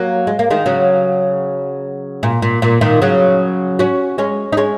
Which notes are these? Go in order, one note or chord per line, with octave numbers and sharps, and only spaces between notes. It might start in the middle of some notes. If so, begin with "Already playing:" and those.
Already playing: F#3 A#3
G#3
A#3
D#3 G#3
C#3 F#3
A#2
A#2
A#2
A#2 D#3
C#3 F#3
C#4 F#4
G#3 C#4
D#4
G#3 C#4